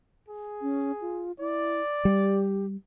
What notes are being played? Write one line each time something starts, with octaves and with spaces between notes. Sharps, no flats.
G#4
C#4
F4
E4 D5
G3 G4